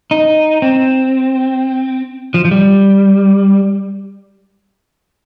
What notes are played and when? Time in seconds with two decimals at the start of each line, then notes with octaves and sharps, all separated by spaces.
0.11 D#4
0.62 C4
2.34 F3
2.45 F3
2.51 G3